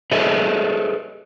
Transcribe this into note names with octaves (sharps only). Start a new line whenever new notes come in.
G#4 A4 B4 C#5 D#5 E5